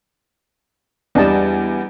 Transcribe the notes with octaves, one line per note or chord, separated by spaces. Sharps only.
E2 G3 D4 D#5 A5